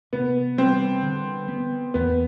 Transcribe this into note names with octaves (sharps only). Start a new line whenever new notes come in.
C3 B3
G3 C4
D3
B3
E2 B3